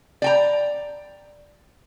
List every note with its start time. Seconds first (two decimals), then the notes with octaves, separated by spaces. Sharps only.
0.22 D5 G5 A#5